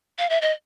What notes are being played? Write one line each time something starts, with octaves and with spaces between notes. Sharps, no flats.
F5
E5
D#5